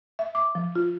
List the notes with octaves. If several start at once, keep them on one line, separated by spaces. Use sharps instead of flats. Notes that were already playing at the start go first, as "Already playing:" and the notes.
E5
D6
F3
F4